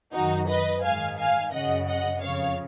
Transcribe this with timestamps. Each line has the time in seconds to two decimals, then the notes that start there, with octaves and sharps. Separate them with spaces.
0.13 F#2 D#3 D#4 F#4
0.48 B4 D#5
0.83 G#2 D#3 F5 G#5
1.18 F5 G#5
1.53 F#2 C#3 D#5 F#5
1.87 D#5 F#5
2.21 F2 C#3 C#5 F5